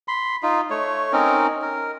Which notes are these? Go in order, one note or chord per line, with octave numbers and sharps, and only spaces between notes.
B5 C6
D#4 F4
A3 C#5
C4 C#4 D#4 A#4
A#4